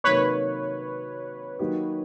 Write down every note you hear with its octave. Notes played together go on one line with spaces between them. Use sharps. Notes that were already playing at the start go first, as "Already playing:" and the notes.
C3 D#3 F#3 A#3 D#4 B4 C#5
D#3 F#3 A#3 D#4 G4